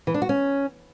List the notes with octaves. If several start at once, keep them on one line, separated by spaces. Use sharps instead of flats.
E3
D4
F#4
C#4